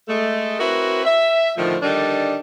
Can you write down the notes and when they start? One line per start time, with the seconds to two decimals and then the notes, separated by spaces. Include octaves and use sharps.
0.08 G#3 A3
0.60 C4 E4 F#4 A#4 B4
1.05 E5
1.57 A2 D3 D#3 F3
1.83 D3 D#3 G3 D4 D#4